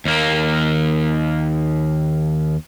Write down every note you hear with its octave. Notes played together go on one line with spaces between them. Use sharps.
D#2 A#3